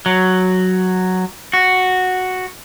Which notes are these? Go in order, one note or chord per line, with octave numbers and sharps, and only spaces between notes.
F#3
F#4